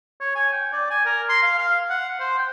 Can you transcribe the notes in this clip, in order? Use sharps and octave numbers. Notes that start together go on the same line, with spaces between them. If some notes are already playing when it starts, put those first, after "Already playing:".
C#5
G#5
G5
D5
G#5
A#4
C6
F5
F5
F#5
C5
G5